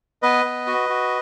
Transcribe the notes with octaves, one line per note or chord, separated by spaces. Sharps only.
B3 B4 D#5
B3
F#4
F#4